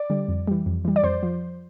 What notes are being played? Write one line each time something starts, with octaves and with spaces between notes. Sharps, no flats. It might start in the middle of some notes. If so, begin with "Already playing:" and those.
Already playing: D5
D3 G3
F2
E3 G3
F2
E3 G3
D5
F2 C5
F3